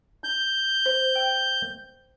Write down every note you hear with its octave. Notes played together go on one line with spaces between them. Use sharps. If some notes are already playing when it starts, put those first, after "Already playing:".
G6
C5
G5